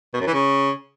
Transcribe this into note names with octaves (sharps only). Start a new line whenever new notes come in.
B2
F#2
E3
C#3